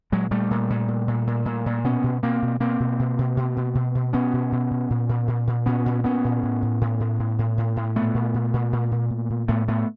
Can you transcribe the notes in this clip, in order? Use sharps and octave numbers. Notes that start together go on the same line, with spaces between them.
A#2 F#3 G#3
A#2 G3 A3
A#2
A#2
A#2
A#2
A#2
A#2
A#2
B2 B3 C#4
B2
B2 A#3 C4
B2
B2 A#3 C4
B2
B2
B2
B2
B2
B2
B2
B2 B3 C#4
B2
B2
B2
A#2
A#2
A#2
A#2
A#2 B3 C#4
A#2
A#2 B3 C#4
A#2
A2
A2
A2
A2
A2
A2
A2
A2
A#2 A3 B3
A#2
A#2
A#2
A#2
A#2
A#2
A#2
A2 A3 B3
A2 A3 B3